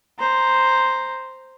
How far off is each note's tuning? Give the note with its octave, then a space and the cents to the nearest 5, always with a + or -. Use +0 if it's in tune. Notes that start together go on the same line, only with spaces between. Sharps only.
C5 +0 A#5 +0